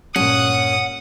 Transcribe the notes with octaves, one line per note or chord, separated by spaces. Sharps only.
G2 A#2 C#4 F#5 D#6